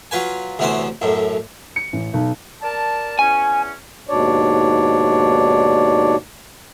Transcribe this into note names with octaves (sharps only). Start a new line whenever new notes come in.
F#3 F4 B4 G#5
D2 C3 E3 B3 C#4 C5
B1 F#2 A2
C#7
A1
B1
A#4 D5 A5
E2 C#4 G#5
D#2 G#2 B2 D4 C#5 D5